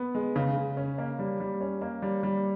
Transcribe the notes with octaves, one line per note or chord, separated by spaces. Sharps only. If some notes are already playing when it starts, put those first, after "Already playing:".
Already playing: B3
G#3
C#3
C#3
C#4
A#3
G3
G3
C#4
A#3
G3
G3